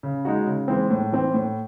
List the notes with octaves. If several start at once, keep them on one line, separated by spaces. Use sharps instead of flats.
C#3
G#3 D#4 F#4
C#3
E3 G#3 C4
A2
E3 C4
A2